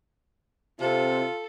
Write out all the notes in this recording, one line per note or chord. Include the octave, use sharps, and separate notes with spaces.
C3 C4 F4 A4